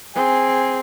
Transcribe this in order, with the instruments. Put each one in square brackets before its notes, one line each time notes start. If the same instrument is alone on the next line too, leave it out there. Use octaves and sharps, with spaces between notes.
[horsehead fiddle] C4 G#4 [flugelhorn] G#5